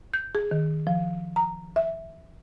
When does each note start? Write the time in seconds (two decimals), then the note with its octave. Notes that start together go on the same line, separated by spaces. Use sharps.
0.14 G6
0.35 G#4
0.51 D#3
0.87 F3
1.36 A#5
1.76 E5